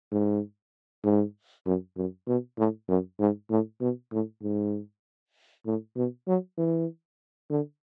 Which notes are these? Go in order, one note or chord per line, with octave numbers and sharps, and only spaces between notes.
G#2
G#2
F#2
F#2
B2
A2
F#2
G#2
A2
B2
A2
G#2
A2
B2
F#3
E3
D3